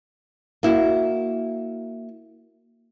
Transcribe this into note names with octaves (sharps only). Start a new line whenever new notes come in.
A#3 E4 F#4